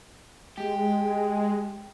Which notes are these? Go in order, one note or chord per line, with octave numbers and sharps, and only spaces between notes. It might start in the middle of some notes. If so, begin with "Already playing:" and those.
G#3 G4